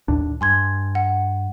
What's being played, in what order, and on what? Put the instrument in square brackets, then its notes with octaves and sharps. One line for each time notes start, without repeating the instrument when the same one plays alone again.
[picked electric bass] D#2 A2 D4
[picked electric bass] G2 [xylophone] G#5 C6 G#6
[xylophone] F#5